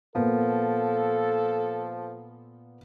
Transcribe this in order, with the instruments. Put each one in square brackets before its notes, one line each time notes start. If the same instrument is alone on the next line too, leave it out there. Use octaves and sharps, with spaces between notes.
[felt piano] A#2 A#3 B3 [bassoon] F3 [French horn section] A4